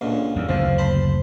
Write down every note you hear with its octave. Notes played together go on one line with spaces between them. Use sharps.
C#2 A#2 D3
D#2
F#1 D2 D3 F3
C5 A5 B5